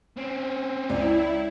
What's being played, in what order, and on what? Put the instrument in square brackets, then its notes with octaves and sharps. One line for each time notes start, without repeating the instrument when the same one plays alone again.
[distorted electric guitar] C4 C#4
[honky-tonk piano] C#2 [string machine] E4 [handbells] D5